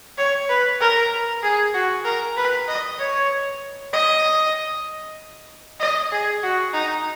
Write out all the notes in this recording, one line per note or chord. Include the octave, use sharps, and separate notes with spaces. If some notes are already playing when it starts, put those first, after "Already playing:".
C#5
B4
A#4
G#4
F#4
A#4
B4
D#5
C#5
D#5
D#5
G#4
F#4
D#4